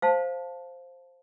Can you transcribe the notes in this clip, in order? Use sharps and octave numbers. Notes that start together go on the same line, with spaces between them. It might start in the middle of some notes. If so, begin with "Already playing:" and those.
C5 F5 A5